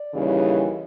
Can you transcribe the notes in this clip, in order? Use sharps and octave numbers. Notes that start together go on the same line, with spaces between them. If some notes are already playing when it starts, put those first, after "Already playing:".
Already playing: D5
D#2 C#3 E3 G3